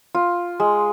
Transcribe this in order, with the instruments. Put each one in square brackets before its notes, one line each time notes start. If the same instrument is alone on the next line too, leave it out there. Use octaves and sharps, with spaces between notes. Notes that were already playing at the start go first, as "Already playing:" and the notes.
[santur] F4
G#3